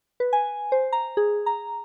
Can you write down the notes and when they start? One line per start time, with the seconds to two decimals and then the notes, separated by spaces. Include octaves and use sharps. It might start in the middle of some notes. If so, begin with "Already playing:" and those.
0.20 B4
0.33 G#5
0.72 C5
0.92 A#5
1.17 G#4
1.46 A#5